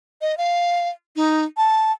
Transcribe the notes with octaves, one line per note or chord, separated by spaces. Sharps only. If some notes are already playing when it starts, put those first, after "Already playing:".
D#5
F5
D#4
A5